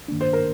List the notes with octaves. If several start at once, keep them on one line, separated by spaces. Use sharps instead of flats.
G2 D#3 A#3 D4
C5
A#4